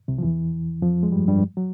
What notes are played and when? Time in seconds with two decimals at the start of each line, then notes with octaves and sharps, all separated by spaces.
0.08 C2 C3
0.18 F3
0.23 E2 E3
0.82 F2 F3
1.03 G#3
1.12 G2 G3
1.28 G2 G3
1.57 F#3